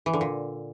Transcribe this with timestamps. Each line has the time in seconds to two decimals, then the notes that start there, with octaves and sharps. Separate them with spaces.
0.06 E3
0.13 D3
0.21 A#2